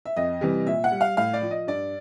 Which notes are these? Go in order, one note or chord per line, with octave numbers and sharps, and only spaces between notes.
E5
F2 D#5
C3 E3 G3
A#2 E5
F#5
G3
F5
A2 F5
D5
F3
D#5
G2 D5